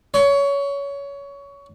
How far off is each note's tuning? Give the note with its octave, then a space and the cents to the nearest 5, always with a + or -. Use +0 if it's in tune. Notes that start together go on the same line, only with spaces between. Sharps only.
C#5 +20 C6 -25